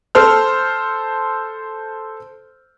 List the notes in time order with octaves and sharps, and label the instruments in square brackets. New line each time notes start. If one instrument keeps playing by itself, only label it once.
[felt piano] A4 C5 F6